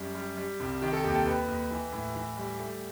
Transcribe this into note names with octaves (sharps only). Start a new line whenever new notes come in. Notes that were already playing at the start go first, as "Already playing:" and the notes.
Already playing: F#2 G3
G3
G3
C2
D#3 G4
A4
D#2 G4
A4
D#2 B4
D#2
E3
A2
E3
G3
A3